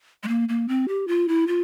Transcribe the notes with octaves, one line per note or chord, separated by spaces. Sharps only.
G#3
A#3
A#3
C4
G4
F4
E4
F4